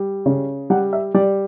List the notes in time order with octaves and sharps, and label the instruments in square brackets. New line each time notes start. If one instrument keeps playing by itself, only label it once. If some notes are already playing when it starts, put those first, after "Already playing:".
Already playing: [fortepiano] G3
C#3
G3 F#5
E5
G3 D5